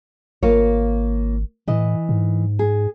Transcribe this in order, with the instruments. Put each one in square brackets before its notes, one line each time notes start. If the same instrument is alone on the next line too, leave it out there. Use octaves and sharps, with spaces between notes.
[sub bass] G#1 [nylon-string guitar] A#3 F4 C#5
[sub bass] A2 [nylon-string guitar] E3 D#5
[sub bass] G#2
[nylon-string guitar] G#4